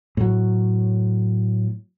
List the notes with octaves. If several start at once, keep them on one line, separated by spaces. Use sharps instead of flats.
A2 F#3